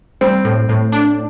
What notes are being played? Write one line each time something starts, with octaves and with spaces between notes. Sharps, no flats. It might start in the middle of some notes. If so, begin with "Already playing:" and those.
G3 C4
A2
A2
D4